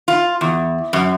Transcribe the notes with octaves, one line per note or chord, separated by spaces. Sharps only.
F4
E2
F#2